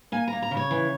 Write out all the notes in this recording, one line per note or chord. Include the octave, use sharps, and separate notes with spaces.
A#3 G#5
A#5
A#3
A#5
C#3
C#5
E3